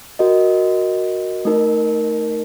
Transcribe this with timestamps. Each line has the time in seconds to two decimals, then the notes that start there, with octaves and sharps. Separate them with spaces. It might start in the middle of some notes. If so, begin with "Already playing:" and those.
0.19 F#4 A#4 D#5
1.45 A3 D#4 A#4